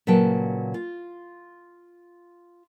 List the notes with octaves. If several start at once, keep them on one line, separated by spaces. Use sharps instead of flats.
A#2 C#3 F#3 B4 G5 A5
F4